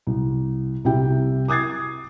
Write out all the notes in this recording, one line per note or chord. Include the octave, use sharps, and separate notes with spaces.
C2
C2 C3 E4 G4 G5
D6 D#6 G#6 A6 C7